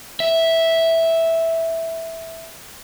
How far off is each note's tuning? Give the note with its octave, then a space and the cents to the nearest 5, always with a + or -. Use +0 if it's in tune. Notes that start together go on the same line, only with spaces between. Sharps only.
E5 -5